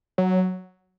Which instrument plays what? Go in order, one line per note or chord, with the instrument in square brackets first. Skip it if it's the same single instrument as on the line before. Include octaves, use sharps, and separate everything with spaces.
[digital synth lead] F#3